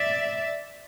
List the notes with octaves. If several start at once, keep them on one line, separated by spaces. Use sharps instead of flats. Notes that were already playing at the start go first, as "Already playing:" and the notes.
Already playing: D5 E5